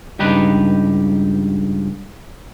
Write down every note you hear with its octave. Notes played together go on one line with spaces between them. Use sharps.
C#2 G2 D#4 G4 B4